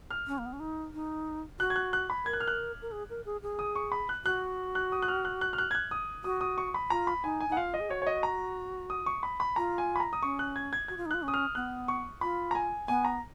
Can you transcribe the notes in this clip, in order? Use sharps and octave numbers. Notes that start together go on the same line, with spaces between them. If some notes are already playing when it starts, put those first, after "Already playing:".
F6
C#4
A#3
B3
C#4
D#4
D#4
F#4 F#6
G#6
F#6
F#6
B5
A#4 G#6
F#6
F6
F#6
A#4
G#4
A#4
G#4
G#4
D#6
C#6
B5
F#6
F#4 F#6
F#6
D#6
F#6
F6
F#6
F#6
F6
F#6
G#6
F#6
D#6
F#4 D#6
D#6
C#6
B5
F4 A#5
B5
D#4 G#5
G#5
D#4
F#5
F4 F5
D#5
G#4
F#4 C#5
C#5
D#5
A#5
D#6
C#6
B5
B5
F4 A#5
G#5
B5
A#5
D#6
C#4 C#6
F#6
G#6
G#6
F#4 G#6
F4
D#4
F4 F#6
C#4
D#6
F6
B3 F#6
C#6
F4 B5
A#5
G#5
B3 G#5
A#5